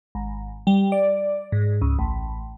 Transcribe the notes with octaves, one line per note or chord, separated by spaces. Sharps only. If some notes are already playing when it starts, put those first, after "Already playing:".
G#1
G3
D5
G#2
C#2
A1